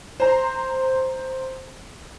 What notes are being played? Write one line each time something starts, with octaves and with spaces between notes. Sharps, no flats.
C5 A#5 C6